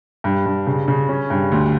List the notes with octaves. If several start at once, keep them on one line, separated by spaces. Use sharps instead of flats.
G2
G2
C#3
C#3
C#4
G2
D2